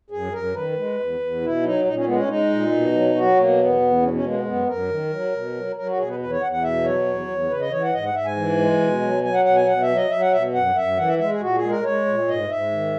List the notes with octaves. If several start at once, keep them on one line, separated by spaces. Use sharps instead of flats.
F#2 G#4
F#2 A#4
D#3 B4
G#3
E2
E2
B2 E4
F#3 D#4
A#2 D#4
C#4
G#3 B3
C#4
G#3 D#4
A#2
B2
F#3
F#3 F#4
B2 A#3
E2 B3
E2
B2 C#4
C#4
G#3 A#3
B3
F#2 B3
F#2 A#4
D#3
F#3
B2
F#3
F#3 A#4
F#4
B2 G#4
B4
E2 B4
C#5
E2 F#5
F#5
B2 E5
F#3 C#5
E2
E2
C#3 B4
D#5
E3 C#5
F#5
G#2 D#5
F#5
G#2 E5
G#5
E3
G#3
B2
F#3
F#3 G#5
F#5
B2 F#5
G#5
B2 F#5
E5
F#3
D#5
F#3 E5
F#5
B2 E5
F#2 F#5
F#2 E5
E3 F#5
E5
G#3 E5
G#4
A#2 F#4
G#4
G#3
A#4
G#3 C#5
A#2
G#2 D#5
G#2 E5
D#3